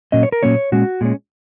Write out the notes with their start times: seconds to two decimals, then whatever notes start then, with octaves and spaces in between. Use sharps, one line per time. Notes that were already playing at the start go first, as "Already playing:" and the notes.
0.12 A#2 F#3 A#3 C#4 D#5
0.23 C#5
0.32 A#4
0.43 A#2 F#3 A#3 C#4 C#5
0.72 A#2 G#3 C#4 F#4
1.01 A#2 G#3 C#4